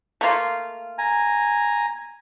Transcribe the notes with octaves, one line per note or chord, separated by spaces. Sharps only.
A3 A#3 F4
G#5 A#5